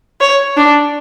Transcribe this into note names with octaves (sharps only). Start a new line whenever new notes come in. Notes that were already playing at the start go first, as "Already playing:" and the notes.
C#5
D4